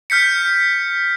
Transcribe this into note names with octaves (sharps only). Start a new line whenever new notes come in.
F6 G6 B6 C#7